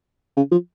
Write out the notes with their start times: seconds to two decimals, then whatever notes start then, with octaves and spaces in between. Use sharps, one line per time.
0.37 C#3
0.52 F3